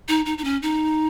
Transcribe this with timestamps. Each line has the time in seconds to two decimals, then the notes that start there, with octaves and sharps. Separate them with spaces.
0.08 D#4
0.26 D#4
0.38 D#4
0.44 C#4
0.62 D#4